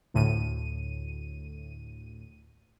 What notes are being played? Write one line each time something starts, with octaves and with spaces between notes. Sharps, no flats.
D2 A2 D#7